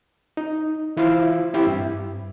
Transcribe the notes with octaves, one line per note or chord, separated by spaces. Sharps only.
D#4
E3 E4 F4 C5 F5
C4 E4 G4 E6
G2